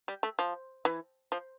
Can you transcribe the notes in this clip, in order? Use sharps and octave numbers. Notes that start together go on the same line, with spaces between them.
G3
A3
F3
E3
F3